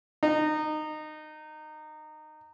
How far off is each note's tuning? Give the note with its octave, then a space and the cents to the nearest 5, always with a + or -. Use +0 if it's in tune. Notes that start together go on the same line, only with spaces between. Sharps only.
D#4 -20